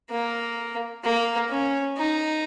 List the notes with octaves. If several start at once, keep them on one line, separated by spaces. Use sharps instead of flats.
A#3
A#3
C#4
D#4